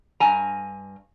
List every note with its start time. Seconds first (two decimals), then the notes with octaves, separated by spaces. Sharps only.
0.20 G2 G#5 A#5